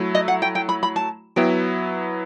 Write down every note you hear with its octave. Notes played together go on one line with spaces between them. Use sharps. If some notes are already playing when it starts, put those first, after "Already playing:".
Already playing: F#3 A3 E4
D#5
F#5
G5
G5
B5
B5
A5
F#3 B3 E4 G5